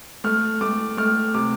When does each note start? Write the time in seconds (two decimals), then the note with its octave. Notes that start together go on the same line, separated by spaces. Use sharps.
0.24 A3 F6
0.61 A3 D6
0.97 A3 F6
1.34 C3 D6